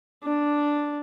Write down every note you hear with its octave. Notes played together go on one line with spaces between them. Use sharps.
D4